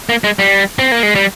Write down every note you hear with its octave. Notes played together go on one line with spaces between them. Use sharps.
A#3
G#3
G3
C4
A#3
G#3
G3